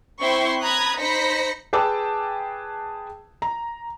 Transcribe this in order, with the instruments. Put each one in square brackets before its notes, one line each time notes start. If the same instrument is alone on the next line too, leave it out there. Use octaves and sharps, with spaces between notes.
[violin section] C4 E4 G5 C6 C#6
A#5 B5 D#6 F#6 G#6 A#6
D#4 C5 B5 A#6 B6 C#7
[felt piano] G#4 B4 G5 A5 D6 E6
A#5